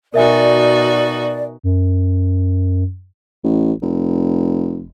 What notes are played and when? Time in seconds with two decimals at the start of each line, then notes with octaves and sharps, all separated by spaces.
0.14 B2 D#4 F#4 A#4 D5 E5 G#5
1.63 F#2
3.44 A1
3.82 F1